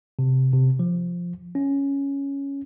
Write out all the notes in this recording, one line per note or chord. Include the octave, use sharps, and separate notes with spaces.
C3
C3
F3
C#4